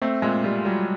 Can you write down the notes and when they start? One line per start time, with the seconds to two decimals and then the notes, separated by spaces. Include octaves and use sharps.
0.02 A3 C4
0.22 A#2 G#3
0.44 G3 F4
0.65 F#3 G3